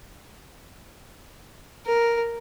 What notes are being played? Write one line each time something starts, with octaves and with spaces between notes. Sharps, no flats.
A#4